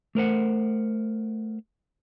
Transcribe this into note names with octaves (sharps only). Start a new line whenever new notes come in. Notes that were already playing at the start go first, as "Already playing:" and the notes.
A3 A#4 C5 F#5